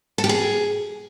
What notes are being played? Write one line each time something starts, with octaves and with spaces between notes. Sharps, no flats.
A4
G4
G#4